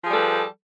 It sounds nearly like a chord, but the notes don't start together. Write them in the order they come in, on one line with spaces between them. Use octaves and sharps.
F3 G#4 G3 A4 B4